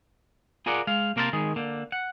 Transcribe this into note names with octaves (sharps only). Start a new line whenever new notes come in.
F4 G#4 A#4 D5 F#5
G#3 F5
C3 A#3 A#4 C5 E5 A5
D#3 G#3 G#4
D3 A#3
F#5